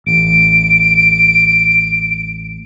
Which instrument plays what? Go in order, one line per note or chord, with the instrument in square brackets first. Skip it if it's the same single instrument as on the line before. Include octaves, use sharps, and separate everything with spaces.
[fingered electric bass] A1 [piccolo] D7